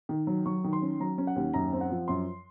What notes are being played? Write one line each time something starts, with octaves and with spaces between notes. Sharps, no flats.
D#3
F#3
F#3 C#6
D#3
C6
C#4
F#3 A#5
C#4
F#5
D#2
F#2 A#5
C4
F#5
F3
F#2 C6